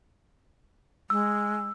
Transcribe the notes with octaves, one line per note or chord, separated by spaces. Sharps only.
G#3 E6